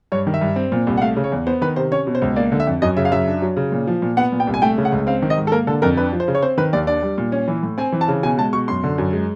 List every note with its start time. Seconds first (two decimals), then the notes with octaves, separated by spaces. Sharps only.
0.12 G2 C#5
0.27 D#3
0.34 E5
0.41 G2
0.56 C4
0.72 A#2
0.87 C2
0.97 F#5
1.02 A3 F5
1.16 C#3
1.24 C#5
1.32 E2
1.47 B3 C5
1.61 D#3 B4
1.76 C3 C5
1.92 C#4 C#5
2.07 B2
2.15 C5
2.22 C#2
2.36 A#3 D5
2.52 D3
2.60 E5
2.67 F2
2.82 F#2 D#5
2.97 C#3 E5
3.05 F5
3.11 F#2 E5
3.27 D4
3.42 F#3
3.57 C#3
3.72 A#2
3.88 F3
4.02 A#2
4.17 B3 F#5
4.32 A#2
4.40 G5
4.47 C2
4.54 G#5
4.62 A3 G5
4.78 C#3
4.85 F#5
4.92 C#2
5.07 C4 F5
5.22 D#3
5.30 D#5
5.38 G#2
5.47 A4
5.52 A#3 A#4
5.67 D3 A4
5.82 F2 A#4
5.97 D4 B4
6.13 F3
6.20 C5
6.28 C#3
6.35 C#5
6.42 C4 C5
6.58 D#3 B4
6.73 D#2 D5
6.87 D4 D5
7.02 G3
7.18 A#2
7.32 C#4
7.48 E3
7.63 A2
7.78 C4 G#5
7.92 E3
8.01 A5
8.08 C#3
8.23 B2 G#5
8.38 G#3 A5
8.53 B2 C#6
8.68 F#2 C6
8.84 D3
8.98 F#2
9.13 G#3